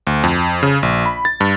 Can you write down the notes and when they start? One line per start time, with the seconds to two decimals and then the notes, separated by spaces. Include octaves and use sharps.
0.07 D2
0.24 F2
0.63 C#3
0.83 A#1
1.06 B5
1.25 A6
1.41 G2